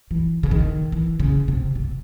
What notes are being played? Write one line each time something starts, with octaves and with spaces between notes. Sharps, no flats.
E3
C#3
D#3
E3
C#3
C3
C3